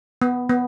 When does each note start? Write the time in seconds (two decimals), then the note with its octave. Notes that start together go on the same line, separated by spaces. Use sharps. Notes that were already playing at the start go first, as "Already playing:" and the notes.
0.22 B3
0.49 B3